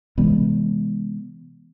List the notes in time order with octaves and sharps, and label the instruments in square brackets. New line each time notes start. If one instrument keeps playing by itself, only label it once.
[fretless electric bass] C3 E3 G#3 B3